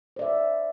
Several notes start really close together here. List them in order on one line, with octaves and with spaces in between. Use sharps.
C5 D5 E5